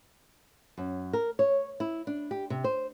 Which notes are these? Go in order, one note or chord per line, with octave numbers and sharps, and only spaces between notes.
F#2
A#4
C#5
E4
D4
G4
C3
C5